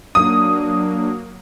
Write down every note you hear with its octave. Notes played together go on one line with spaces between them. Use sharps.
F#3 A#3 D4 D#6